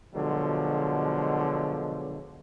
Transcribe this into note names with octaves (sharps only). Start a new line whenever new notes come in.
B2 D3 F3 F#3 G#3